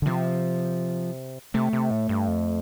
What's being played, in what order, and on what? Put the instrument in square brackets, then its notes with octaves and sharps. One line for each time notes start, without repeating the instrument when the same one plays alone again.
[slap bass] D3
[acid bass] C3 [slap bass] F3
[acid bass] C3 [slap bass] A3
[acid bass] C3
A2
G2
F2